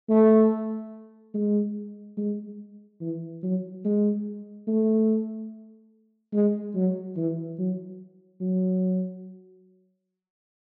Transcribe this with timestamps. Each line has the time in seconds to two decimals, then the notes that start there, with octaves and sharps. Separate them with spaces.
0.09 A3
1.34 G#3
2.18 G#3
3.01 E3
3.43 F#3
3.84 G#3
4.67 A3
6.33 G#3
6.75 F#3
7.17 E3
7.59 F#3
8.41 F#3